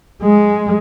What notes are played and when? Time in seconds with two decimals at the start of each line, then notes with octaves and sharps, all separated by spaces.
0.23 G#3